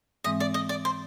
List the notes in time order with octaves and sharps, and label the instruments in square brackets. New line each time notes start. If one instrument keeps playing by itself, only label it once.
[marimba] G#2 E3 G#3 C4 [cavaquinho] D#5
[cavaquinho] D5
D#5
D5
C5